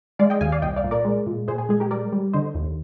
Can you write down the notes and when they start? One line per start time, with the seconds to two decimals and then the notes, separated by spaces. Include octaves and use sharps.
0.19 G#3 D5 F5
0.30 D#5 G5
0.41 D#2 F5 G#5
0.52 D5 F5
0.62 C2 D#5 G5
0.76 D5 F5
0.84 A#2
0.91 A#4 D5
1.05 G#3
1.26 A#2
1.48 A#2 G#4 C5
1.58 G#4
1.69 G#3 G#4
1.80 G4 A#4
1.91 G3 A#4 D5
2.12 G3
2.33 D3 C5 D#5
2.55 D#2